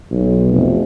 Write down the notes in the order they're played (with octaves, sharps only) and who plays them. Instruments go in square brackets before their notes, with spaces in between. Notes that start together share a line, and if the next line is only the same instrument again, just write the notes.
[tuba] B1
F1